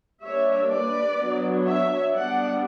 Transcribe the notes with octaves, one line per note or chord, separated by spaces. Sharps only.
G3 A#3 D4 C#5 E5
B4 D5
F#3 B3 D4
C#5 E5
G3 B3 D4 D5 F#5